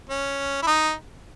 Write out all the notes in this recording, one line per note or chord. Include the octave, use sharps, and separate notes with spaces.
C#4
E4
D#4